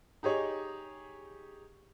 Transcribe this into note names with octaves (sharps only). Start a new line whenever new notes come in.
D#4 G4 G#4 C#5